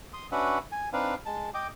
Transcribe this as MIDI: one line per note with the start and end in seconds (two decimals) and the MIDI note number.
0.13 0.27 84
0.13 0.27 87
0.32 0.59 61
0.32 0.59 62
0.32 0.59 66
0.32 0.59 71
0.32 0.59 76
0.32 0.59 78
0.72 0.89 80
0.93 1.15 60
0.93 1.15 62
0.93 1.15 63
0.93 1.15 71
0.93 1.15 77
1.26 1.50 56
1.26 1.50 81
1.54 1.67 75
1.54 1.67 79
1.54 1.67 86